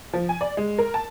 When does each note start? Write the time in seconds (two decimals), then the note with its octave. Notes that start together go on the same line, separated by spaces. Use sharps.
0.13 F3
0.29 G#5
0.41 D5
0.57 G#3
0.78 A#4
0.94 A5